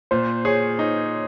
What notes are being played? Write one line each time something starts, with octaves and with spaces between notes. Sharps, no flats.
A#2 C5
G#4 C#5
D#4